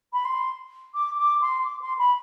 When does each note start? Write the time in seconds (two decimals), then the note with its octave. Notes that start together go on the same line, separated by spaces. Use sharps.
0.13 B5
0.24 C6
0.94 D6
1.17 D6
1.41 C6
1.64 D6
1.81 C6
1.98 B5